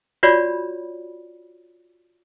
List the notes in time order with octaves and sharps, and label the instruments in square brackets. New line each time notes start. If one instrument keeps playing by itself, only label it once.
[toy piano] F4 F#4 C#5 D5 B5